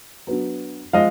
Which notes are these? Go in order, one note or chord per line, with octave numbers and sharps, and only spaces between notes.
F#3 B3 D4
F3 G#3 D#5 F5